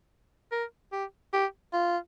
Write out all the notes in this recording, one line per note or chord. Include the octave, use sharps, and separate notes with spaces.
A#4
G4
G4
F4